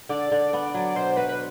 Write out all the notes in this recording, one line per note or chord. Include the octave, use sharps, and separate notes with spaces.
D3 D5
D3
B3
F#3
B2 C5
F#4 B4
B4